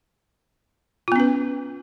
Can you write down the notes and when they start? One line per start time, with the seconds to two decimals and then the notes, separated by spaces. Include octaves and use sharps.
1.08 F4
1.12 B3
1.16 C#4
1.20 B4